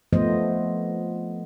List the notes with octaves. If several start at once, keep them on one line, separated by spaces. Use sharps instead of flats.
F3 A3 B3 C5 D#5